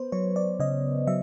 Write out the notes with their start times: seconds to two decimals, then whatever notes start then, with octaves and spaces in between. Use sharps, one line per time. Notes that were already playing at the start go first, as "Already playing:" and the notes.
Already playing: B3 B4 C5
0.12 F#3 C#5
0.36 D5
0.60 C#3 D#5
1.07 F#3 E5